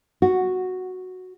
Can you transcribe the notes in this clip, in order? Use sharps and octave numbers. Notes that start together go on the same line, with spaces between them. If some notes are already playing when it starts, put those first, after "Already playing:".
F#4